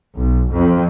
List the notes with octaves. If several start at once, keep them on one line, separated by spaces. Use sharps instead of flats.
B1
F2